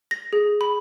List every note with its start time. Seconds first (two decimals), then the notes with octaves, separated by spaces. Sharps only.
0.11 A#6
0.33 G#4
0.61 B5